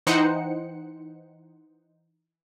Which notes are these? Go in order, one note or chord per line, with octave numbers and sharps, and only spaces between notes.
E3 D#4 C5 F#5 G5 C#7